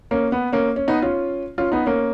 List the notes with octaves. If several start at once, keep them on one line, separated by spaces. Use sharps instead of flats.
A#3 C#4
B3
A#3 C#4
C#4
B3 D#4
C#4 F4
C#4 F4
B3 D#4
A#3 C#4